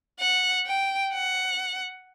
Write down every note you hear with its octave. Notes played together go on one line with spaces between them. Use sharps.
F#5
G5
F#5